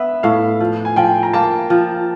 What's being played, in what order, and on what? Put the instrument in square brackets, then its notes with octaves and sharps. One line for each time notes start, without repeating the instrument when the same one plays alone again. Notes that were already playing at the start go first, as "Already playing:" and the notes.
Already playing: [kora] B3 [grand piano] E5
[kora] A2 [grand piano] F5
[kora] F3
[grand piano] G#5
[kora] F3 [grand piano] G5
[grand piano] A#5
[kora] A#3 [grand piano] A5
[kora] F3